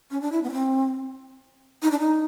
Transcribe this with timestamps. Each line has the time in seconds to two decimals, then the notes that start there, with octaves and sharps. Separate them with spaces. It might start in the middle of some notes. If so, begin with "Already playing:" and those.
0.11 C#4
0.22 D4
0.32 E4
0.43 B3
0.50 C#4
0.53 C4
1.83 D#4
1.91 D4
1.99 D#4